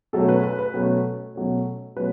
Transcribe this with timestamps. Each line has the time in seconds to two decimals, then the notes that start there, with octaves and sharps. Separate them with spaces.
0.13 B2 F#3 A3 C#4 A4
0.29 B4
0.44 B4
0.59 B4
0.74 B2 F#3 A3 C#4
1.35 B2 F#3 A3 C#4
1.96 B2 F#3 A3 C#4 B4